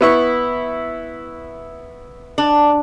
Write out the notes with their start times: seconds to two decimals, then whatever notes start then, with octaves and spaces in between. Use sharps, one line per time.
0.01 B3 E4 C#6
2.38 D4